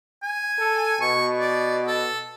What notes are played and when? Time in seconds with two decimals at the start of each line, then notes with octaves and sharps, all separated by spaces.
0.23 G#5
0.59 A4
1.01 B2 C#6
1.40 D5
1.87 A4